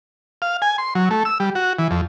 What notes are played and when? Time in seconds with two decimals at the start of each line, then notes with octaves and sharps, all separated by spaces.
0.42 F5
0.62 G#5
0.78 C6
0.95 F#3
1.11 A3
1.25 E6
1.40 G3
1.55 F#4
1.79 E3
1.91 F2